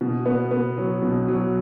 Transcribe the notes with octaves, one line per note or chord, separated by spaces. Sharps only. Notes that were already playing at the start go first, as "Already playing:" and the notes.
B2
B3
B3
F#3
B2
F#3